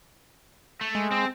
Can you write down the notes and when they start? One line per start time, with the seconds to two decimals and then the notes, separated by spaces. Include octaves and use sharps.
0.81 A3
0.95 G#3
1.11 C4